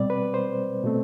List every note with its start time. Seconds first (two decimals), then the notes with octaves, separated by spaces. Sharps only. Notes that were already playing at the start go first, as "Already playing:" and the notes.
Already playing: B2 G3 C4 D5
0.10 B4
0.34 C5
0.84 B2 A3 C4